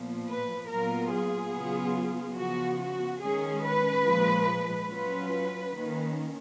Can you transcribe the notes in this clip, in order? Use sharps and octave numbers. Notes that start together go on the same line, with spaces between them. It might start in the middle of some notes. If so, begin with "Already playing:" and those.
Already playing: A#2 F3 B3
B4
A#2 F#3 B3 F4 A#4
G#4
C#3 F#3 B3 F4
C#3 F3 B3 F#4
F#4
D#3 G#3 C#4 G#4
B4
A#2 F3 G#3
F#3 C#4 F4 B4
D#3 A#3 C#4